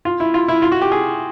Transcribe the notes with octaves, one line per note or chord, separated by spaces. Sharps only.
F4
E4
F4
E4
F4
F#4
G4
G#4